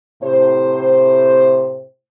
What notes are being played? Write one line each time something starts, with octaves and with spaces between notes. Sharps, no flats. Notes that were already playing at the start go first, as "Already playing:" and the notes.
A2 C3 C5